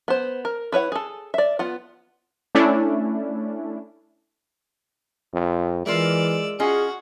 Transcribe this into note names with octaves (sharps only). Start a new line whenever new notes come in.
B3 C5
A#4
E4 B4 C#5 F#5
G#4 A4
D5 E5
B3 F4 F#5
A3 C#4 D4 E4
F2
E3 G#3 F4 A#4 D5 E5 E6
C#4 F4 F#4 G#4 D#5